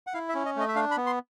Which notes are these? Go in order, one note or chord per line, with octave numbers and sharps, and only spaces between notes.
F#5
E4 F5
E5
C#4
D#5
A3 D#5
E5
D4 F5
B5
B3
C6